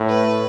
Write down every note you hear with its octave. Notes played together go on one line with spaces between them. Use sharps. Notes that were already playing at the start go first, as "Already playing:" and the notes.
Already playing: A2
B4